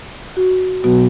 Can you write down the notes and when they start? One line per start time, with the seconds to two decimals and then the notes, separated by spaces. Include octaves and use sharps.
0.37 F#4
0.84 B2 F#3 B3 F#4